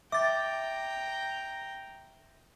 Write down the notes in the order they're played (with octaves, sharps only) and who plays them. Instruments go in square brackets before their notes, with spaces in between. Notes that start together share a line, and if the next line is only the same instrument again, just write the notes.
[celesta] E5 [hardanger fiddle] G5 A#5 [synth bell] D6 A6